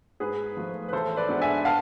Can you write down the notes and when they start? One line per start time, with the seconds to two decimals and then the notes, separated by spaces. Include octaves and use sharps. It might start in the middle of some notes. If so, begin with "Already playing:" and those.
0.20 G#2 G#4 B4
0.57 F3 A3
0.88 B4
0.93 A1 A4 C5
1.16 B4 D5
1.29 G#2 G#3 B3 D4
1.42 E5 G#5
1.65 F5 A5